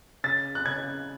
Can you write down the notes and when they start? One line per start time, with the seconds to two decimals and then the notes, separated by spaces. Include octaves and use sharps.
0.24 C#3 A6
0.55 F#6
0.66 C#3 G#6